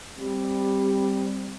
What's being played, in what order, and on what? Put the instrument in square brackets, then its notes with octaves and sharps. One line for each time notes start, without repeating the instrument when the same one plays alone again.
[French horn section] G3 C4